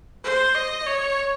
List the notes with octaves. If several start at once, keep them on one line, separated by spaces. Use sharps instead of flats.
C5
D#5
C#5